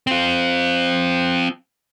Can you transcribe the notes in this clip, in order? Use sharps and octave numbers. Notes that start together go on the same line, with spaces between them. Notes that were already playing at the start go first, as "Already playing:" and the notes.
C4 F4